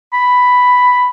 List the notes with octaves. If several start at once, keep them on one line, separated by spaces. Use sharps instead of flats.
B5